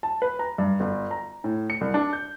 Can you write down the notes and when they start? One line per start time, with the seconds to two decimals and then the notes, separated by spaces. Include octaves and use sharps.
0.03 A5
0.22 B4
0.39 A#5
0.58 G2
0.80 G1
1.11 A#5
1.44 A2
1.70 C#7
1.81 C2
1.94 D4
2.13 G6